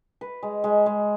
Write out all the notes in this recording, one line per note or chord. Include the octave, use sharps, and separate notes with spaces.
B4
G#3
G#3
G#3